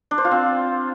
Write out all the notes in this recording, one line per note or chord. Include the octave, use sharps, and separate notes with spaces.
D4
C5
F4
C4